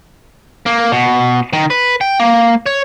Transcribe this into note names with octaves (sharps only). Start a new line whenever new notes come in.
A#3
B2
D#3
B4
G5
A#3
C#5